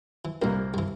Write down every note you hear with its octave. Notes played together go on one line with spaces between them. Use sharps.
E3
C2 A#2 G3 A#3
G2 E3